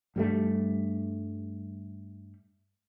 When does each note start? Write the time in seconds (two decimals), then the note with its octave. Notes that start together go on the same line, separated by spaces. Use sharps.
0.16 G2 G3 A3